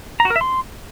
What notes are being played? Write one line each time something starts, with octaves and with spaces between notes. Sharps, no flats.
A#5
F#4
A#4
E5
C6